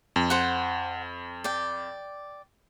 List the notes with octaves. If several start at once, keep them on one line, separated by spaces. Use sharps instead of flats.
F2
C5 F#5
D5 G5